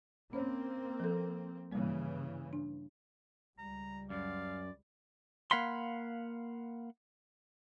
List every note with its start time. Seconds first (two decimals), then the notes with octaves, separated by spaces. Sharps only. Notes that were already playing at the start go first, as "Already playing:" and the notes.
0.33 A#3 C4 C#4 C5 C#5
1.00 F3 A4
1.72 G2 C#3 E3 G3 A#3
2.53 D4
3.58 C#2 G3 A#5
4.10 F#2 D5 F5
5.51 A#3 F5 F#5 B5 C6